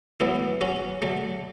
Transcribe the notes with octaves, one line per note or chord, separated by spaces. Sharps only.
A2 F#3 B3 E4
F#3 C#4 F#4
D3 F#3 A3